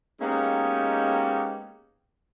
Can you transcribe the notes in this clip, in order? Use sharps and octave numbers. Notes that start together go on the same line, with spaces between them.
G#3 A#3 B3 C#4 D#4 G4